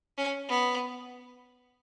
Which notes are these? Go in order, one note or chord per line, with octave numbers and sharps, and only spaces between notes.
C#4
B3